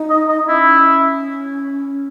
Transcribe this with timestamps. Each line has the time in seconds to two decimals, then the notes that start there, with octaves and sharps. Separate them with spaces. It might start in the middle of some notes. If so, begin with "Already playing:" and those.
Already playing: D#4
0.10 D#5
0.29 D#5
0.43 D#4
0.47 C#4 E4